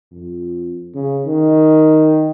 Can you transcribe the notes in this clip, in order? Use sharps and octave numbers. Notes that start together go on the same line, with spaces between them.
F2
C#3
D#3